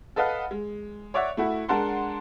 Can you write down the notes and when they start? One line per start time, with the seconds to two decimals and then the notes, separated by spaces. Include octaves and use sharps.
0.16 A4 B4 D#5 F5 F#5
0.51 G#3
1.14 C#5 D5 E5 F#5
1.37 A3 E4 F#4
1.69 G#3 D4 A#4 F#5 A5 C6